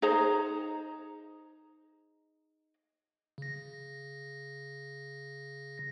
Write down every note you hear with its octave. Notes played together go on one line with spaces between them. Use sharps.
D#4 G#4 C5 A#5
C#3 A#6